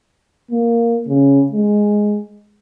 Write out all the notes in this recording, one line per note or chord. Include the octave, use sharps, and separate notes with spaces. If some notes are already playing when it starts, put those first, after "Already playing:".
A#3
C#3
G#3